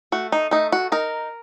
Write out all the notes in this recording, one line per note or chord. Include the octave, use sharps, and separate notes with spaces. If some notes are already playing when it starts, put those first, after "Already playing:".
A3 F#4
D#4
A3 D#4
F#4
D#4 A#4